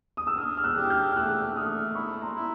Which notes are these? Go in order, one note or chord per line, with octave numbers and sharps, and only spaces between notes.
D#6
E6
D4 D#6 F6
F6
E6 F#6
G4
F6 G6
F6
A3 E6 F#6
A3 D#6 F6
E4 B5 C#6
A#5 C6
E4